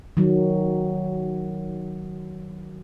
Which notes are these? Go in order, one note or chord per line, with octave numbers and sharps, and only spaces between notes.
D#3 F#3